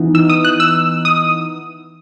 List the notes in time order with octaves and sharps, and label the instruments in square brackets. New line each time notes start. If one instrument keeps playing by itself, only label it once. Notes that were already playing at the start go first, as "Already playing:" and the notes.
Already playing: [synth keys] E3 B3 D#4
E6
D#6
F#6
E6
D#6